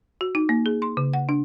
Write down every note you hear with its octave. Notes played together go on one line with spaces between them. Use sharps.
F#4
D#4
A#3
G#4
C6
C#3
F#5
D4